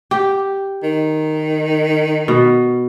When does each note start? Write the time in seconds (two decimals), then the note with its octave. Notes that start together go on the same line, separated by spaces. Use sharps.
0.11 G4
0.83 D#3
2.28 B2